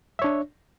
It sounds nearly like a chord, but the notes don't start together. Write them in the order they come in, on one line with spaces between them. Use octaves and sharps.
E5 C#5 D4